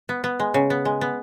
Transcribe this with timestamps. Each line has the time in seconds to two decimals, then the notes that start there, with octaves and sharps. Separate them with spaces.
0.09 B3
0.24 B3
0.40 G#3
0.54 C#3
0.70 B3
0.85 G#3
1.01 B3